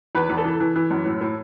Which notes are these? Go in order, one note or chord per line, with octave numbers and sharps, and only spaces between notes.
E2 B4
E2
A4
E3
E3
E3
F#2
A2
A2